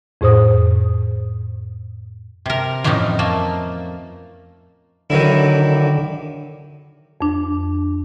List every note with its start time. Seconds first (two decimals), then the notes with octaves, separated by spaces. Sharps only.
0.21 F2 A2 G#4 C5 D#6
2.46 C3 A#4
2.84 F2 A2 E3 C#4 D#4
3.19 A3 A#3
5.10 D3 D#3 F#3 E4
7.21 F2 D4